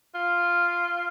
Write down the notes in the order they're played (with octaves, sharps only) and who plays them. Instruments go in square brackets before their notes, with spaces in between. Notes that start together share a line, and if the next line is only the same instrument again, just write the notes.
[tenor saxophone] F4